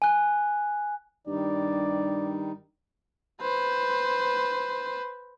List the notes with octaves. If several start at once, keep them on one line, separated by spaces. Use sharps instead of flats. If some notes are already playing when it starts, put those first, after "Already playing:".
G#5 F#6
G2 D#3 G3 D#4 D5
B4 C5